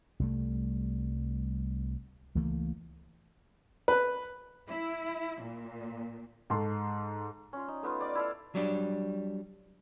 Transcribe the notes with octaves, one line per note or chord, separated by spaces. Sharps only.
C2 G3 A3
C#2 E3 A3 A#3
B4
E4
A#2
G#2 A4 C6
C#4 F4
D#4
A3 B3 D#4 F4
D5 D6
E4 A4 F5
F#3 G3 D4